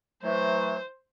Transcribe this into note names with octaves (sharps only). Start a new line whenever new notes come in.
E3 F#3 A3 C5